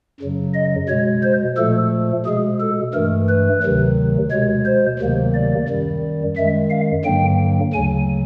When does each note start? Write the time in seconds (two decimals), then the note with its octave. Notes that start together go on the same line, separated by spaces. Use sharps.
0.21 F#2 C#3 F#3
0.54 D#5
0.89 B2 G#3 C#5
1.23 C5
1.57 A#2 F3 A3 A4
2.26 B2 G#3 G#4
2.60 A4
2.94 G2 E3 A3 A#4
3.29 B4
3.63 D2 C3 D#3 F#3
4.31 B2 G#3 C#5
4.66 C5
4.99 D2 C3 D#3 F#3 A#3
5.34 D5
5.68 F#2 D#3 G3
6.37 F#2 D#3 G#3 E5
6.70 F5
7.05 G2 D3 F#3 A#3 G5
7.73 D2 C#3 F#3 G#5